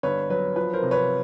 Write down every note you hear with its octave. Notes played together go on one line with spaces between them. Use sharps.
G1 B4 C#5
F#3 B4
F3 B4
A#4 C5
C3
B4 C#5